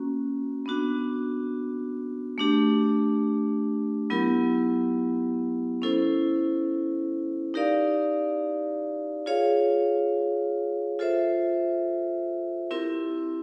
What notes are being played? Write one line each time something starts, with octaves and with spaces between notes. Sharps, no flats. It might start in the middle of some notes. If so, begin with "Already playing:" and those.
Already playing: A#3 C#4 F#4
B3 D4 F#4
A3 D4 G4
F#3 B3 E4 G4 A#4
C#4 E4 A4 C5
D#4 G4 A#4 D5 F5
F4 G#4 C#5 F5
F4 A4 C5 E5
C4 E4 G4 A#4